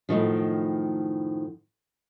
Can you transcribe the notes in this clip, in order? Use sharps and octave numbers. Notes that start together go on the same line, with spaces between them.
F#2 A2 C3 D#3 F3